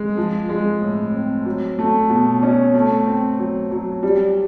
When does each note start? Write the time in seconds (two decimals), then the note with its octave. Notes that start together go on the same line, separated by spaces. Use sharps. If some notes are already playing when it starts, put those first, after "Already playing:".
Already playing: G#3
0.17 F3
0.49 G#3
0.81 A2
1.13 C4
1.45 F#3
1.79 A3
2.10 B2
2.43 C#4
2.75 A3
3.06 C4
3.39 F#3
3.71 F#3
4.03 G3